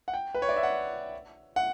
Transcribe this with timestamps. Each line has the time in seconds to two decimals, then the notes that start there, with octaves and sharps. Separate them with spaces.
0.08 F#5
0.14 G5
0.35 B4
0.42 C#5
0.49 D5
0.56 E5
0.63 F#5
1.56 F#5